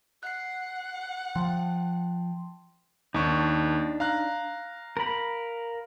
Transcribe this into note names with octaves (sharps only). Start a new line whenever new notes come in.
F#5 F#6 C7
F3 G5 A5 C6
D#2 D4 D#4 C#6
F5 A#5 F#6
A#4 B5